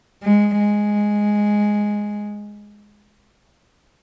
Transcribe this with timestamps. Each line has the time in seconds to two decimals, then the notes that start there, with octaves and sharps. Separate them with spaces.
0.24 G#3
0.59 G#3